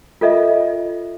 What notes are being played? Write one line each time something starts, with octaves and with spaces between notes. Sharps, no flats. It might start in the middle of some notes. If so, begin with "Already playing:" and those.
F4 A4 D#5 E5